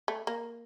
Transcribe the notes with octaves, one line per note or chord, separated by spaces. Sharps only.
A3
A#3